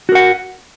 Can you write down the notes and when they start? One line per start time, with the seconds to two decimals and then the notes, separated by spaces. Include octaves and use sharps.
0.09 F#4
0.12 A#4
0.15 F#5